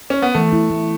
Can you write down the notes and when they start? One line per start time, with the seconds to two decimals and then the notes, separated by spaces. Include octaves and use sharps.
0.10 C#4
0.22 B3
0.34 E3 A3
0.53 E4
0.70 A3